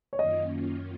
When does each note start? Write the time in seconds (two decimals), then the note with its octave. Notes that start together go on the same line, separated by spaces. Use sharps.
0.13 C#5
0.19 F#2 D#3 A#3 C#4 F4 D#5